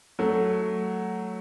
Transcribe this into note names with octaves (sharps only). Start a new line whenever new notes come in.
F#3 A3